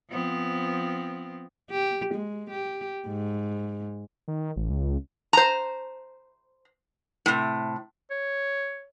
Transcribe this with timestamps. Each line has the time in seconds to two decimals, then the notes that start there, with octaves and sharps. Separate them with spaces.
0.10 F3 B3 C4
1.71 G4
2.14 G#3
2.50 G4
3.08 G#2
4.28 D#3
4.56 A1
4.70 C#2
5.33 C5 A#5
7.26 A2 C3
8.10 C#5